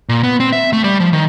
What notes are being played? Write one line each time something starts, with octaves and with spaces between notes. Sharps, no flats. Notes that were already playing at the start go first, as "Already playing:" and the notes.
A#2
B3
C4
E5
A3
G3
F3
D#3